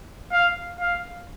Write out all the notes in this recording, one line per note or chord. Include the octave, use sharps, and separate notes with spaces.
F5
F5